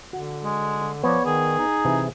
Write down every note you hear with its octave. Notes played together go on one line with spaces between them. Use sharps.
D3 F#4
G#3
F3 B3 C#5 D5
D#3 G#4
D#4
C3 E3 G#5